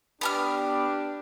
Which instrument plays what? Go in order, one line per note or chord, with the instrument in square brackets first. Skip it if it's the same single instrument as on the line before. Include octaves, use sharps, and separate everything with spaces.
[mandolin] B3 G#5 F6 [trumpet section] D4 G4